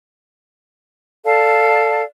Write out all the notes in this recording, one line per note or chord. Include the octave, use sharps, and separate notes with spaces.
A4 D5 F5 A5